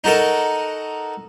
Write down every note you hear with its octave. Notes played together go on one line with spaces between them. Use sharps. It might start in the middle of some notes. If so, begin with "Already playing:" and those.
D#4 F#4 A4 A#4 D#5